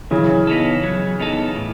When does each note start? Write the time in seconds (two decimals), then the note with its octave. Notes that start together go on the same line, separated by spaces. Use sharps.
0.11 C#3 E3 F#3
0.47 B3 D#4 A4
0.83 F#3
1.20 B3 D#4 A4
1.56 A2